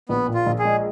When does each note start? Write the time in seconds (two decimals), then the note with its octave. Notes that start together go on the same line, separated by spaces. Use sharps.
0.09 A#1 B3
0.28 A#2
0.34 F4
0.46 A#1
0.59 G#4
0.65 G#3